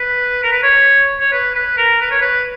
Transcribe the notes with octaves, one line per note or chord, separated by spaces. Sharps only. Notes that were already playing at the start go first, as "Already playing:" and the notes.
Already playing: B4
A#4
B4
C#5
C#5
B4
B4
A#4
B4
C#5
B4